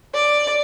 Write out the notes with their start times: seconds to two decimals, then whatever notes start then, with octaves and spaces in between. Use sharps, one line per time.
0.14 D5